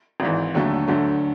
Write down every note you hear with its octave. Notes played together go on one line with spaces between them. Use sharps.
G#1 G#2 E3
D#2 D3 F#3 A3
D2 D3 F#3 A3